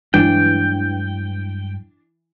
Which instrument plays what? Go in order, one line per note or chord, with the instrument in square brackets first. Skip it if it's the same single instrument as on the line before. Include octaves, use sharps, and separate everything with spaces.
[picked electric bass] G2 F#3 G#3 [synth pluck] E3 [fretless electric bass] D4 [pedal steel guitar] G5